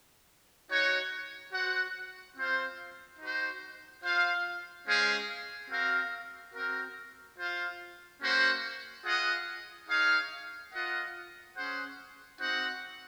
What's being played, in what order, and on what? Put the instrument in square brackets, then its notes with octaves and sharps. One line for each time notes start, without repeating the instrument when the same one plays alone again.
[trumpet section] D#4 F#4 C#5 F#5
F#4 C5 F#5
C4 F4 C5 F5
D#4 F#4 C5
F4 C5 F5
G#3 C#4 G#4 C5 F5
C4 F#4 A#4 F5
C4 F#4 A#4
F4 C5 F5
A#3 C#4 F#4 C5 F#5
F4 G#4 D#5 F#5
D#4 G#4 C#5 F5
F4 A#4 D#5 F#5
C#4 G#4 C5 F#5
C4 D#4 F#4 C5 F#5